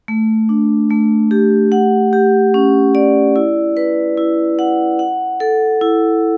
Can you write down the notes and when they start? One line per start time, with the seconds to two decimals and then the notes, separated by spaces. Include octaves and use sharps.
0.08 A3
0.49 D4
0.90 A3
1.31 G4
1.72 F#5
2.13 G4
2.54 C#4
2.95 D5
3.36 E4
3.77 B4
4.18 E4
4.59 F#5
4.99 F#5
5.40 A4
5.81 E4